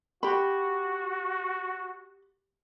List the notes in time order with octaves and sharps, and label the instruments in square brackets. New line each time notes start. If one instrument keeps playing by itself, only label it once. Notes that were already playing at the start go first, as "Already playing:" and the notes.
[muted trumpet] F#4 [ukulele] G4 B5